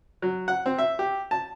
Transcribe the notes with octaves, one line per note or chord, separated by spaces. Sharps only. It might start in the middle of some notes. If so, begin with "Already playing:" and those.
F#3
F#5
C4
E5
G4
A5